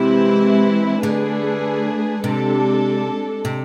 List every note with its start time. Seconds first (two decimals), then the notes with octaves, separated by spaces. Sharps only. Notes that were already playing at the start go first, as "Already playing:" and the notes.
Already playing: C3 E3 G#3 C4 E4
1.03 D3 A3 D4 G#4 B4
2.23 C3 G#3 D4 A4
3.45 C3